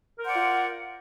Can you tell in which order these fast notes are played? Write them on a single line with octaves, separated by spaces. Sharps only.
A#4 C5 F#5 D5 F4